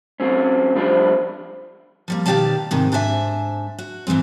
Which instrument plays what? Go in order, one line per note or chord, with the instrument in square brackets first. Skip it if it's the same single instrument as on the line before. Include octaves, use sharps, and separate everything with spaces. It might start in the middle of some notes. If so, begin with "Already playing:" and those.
[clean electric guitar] F#3 C4 C#4
F3 G3 D4 C5
[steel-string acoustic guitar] F3 G3 A#3
B2 D#3 G4 D5 F5 A5
G#2 C3 D#3
G#2 D4 C5 E5 G#5
F#4
G#2 E3 F3 G#3 C4